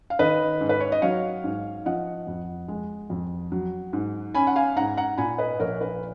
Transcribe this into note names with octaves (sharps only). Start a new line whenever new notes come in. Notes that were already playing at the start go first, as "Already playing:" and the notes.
F5
D#3 B4 D#5
G#2
B4
C#5
D#5
F#3 C#5 F5
G#2
F3 D#5 F#5
F2
G#3
F2
F#3
G#2
C#4 G#5 B5
F#5
F5 G#5
G#2 F#5 A#5
F#5 A#5
A#2 G#5 B5
B4 D#5
A#1 A#4 C#5
B4